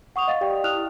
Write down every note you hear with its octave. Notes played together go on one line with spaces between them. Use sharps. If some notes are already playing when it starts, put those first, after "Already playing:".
F#5 C#6 D#6 F7
D#5 F5 A6
G4 D5 G5
E4 G4 D#6 F6 F#6 F7